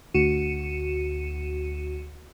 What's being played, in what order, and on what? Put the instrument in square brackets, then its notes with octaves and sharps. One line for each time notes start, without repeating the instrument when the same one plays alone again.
[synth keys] D2 F#4 C#7 D#7 E7